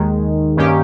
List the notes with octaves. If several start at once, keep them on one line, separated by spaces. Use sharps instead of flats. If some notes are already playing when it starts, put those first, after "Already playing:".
Already playing: D#2 D#3 G#3
G2 D#3 A#3 C#4 G4